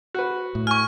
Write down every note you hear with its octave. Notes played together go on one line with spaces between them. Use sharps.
F#4 B4
A2
G#5 C#6 F6